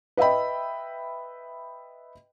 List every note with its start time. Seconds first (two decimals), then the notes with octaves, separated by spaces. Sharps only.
0.17 B4 D#5 E5 G5 B5